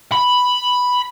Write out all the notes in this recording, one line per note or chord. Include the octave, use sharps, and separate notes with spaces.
B5